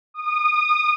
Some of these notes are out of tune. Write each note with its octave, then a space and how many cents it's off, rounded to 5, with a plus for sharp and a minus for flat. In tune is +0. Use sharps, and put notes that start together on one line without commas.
D#6 -25